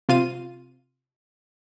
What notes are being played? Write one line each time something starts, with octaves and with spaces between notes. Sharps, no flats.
C3 F4 D#7